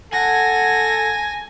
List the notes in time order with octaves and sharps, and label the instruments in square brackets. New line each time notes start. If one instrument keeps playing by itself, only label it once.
[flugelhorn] A4 [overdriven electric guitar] F#5 [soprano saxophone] G#5 [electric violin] G#6 A#6